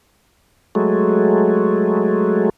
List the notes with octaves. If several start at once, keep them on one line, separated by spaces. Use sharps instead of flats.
F#3 G#3 A3